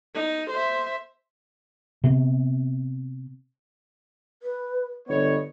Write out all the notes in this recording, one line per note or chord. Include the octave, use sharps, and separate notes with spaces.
D#4
C5 E5
C3 B3 C4
B4
G1 B3 C#5 D#5